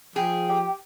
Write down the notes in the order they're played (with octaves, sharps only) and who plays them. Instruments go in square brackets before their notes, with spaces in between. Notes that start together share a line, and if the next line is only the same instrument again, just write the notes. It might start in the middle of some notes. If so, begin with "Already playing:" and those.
[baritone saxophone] F3 [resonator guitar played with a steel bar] G#4 [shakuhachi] G5
[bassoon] G4